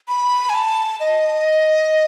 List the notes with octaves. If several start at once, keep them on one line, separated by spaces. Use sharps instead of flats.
B5
G#5
A5
D#5